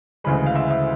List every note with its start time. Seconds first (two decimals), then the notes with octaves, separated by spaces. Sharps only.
0.24 D2 C#3 E3 G#3 B5
0.46 F5
0.55 E5
0.71 E5